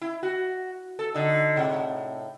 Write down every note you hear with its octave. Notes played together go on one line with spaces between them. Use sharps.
E4
F#4
A4
D3 D#4
A2 C3